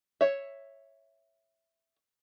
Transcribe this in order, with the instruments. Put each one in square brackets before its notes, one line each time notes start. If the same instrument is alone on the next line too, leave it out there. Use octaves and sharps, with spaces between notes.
[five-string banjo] C#5 E5